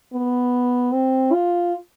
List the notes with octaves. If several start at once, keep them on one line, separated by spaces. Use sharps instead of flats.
B3
C4
F4